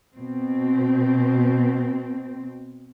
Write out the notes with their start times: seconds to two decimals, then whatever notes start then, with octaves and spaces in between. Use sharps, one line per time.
0.15 B2 C4